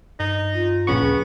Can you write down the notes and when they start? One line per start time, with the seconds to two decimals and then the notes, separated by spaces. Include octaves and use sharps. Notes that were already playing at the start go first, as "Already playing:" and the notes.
0.20 G2 D#4
0.54 F4
0.87 A#1 C#3 B3 C#6
1.02 D2 G#4